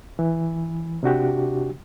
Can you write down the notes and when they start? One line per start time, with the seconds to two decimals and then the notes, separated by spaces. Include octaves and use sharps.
0.19 E3
1.03 C3 D4 F#4 G4